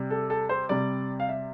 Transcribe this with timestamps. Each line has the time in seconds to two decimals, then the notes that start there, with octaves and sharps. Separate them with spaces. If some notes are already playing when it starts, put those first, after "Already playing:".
Already playing: C3 G3
0.10 A4
0.30 A4
0.49 C5
0.69 C3 G3 D5
1.20 F5
1.29 E5